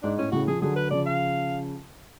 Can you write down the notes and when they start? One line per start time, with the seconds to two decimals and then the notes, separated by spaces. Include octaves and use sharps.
0.03 G#2 D4
0.18 A2 C#4
0.32 A2 C#3 F#4
0.47 C#3 F3 G#4
0.62 D3 F#3 G#4
0.76 B4
0.90 C#3 F3 D5
1.06 F5